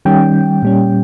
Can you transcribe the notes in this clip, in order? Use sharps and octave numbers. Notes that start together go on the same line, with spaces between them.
D#3 G3 C#4 G5
A#2 G3 C#4